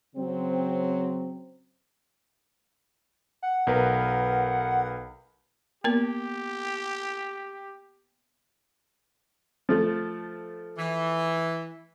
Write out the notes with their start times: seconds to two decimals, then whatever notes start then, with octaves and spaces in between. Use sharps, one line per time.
0.16 C#3 F#3 C4
3.43 F#5
3.67 B1 A#4 B4
5.84 A#3 B3 G4 A#4
9.69 F3 A3
10.78 E3